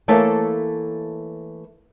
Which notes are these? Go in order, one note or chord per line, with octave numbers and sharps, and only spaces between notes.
E3 A3 A#3 A4 C#5 E5